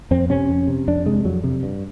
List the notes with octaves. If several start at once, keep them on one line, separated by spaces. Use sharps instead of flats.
F2 C4
C3 C#4
F2
C3
F2 D4
C3 G#3
F2 F#3
C3
G2